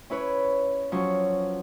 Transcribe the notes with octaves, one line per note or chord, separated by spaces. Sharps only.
C#4 E4 B4 C#5
F3 F#3 C#4 C#6